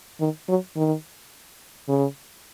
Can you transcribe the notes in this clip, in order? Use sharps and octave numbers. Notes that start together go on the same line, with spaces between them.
D#3
F#3
D#3
C#3